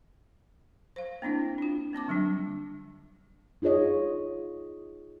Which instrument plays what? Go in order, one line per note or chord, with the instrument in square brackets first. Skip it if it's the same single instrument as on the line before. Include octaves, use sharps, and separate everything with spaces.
[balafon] C5 F5
A#3 C4 D4 E4
D4 F4
A#3 C4 A5 D6
D3 F#3 G3 D4
[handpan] D#4 F4 G#4 C#5 D#5